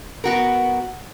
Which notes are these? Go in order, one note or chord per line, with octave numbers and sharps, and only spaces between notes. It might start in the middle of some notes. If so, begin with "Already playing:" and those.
B3 F#4 A#4